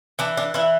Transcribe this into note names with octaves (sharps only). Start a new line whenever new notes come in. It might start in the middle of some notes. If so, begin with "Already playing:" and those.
E3 D4
D4
E3 E4